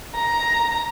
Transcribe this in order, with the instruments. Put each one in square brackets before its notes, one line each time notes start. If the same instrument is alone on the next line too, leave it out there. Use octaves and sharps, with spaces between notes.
[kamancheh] A#5